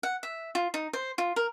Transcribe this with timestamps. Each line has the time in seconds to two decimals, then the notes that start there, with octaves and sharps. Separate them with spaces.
0.03 F#5
0.23 E5
0.55 F4
0.74 D#4
0.93 C5
1.18 F4
1.36 A#4